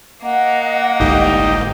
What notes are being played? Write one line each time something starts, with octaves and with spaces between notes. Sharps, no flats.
A#3 D#5 F#5
G1 C2 G#2 D#4 G4